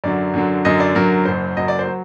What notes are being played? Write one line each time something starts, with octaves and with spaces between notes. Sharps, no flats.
F#2 D3 F#3 D5
F#2 D3 F#3
F#2 D3 F#3 D#5
D5
F#2 D3 F#3 A#4
F#1 F#2 F#3 C5
F#1 F#2 F#3 D#5
D5
C5
F#3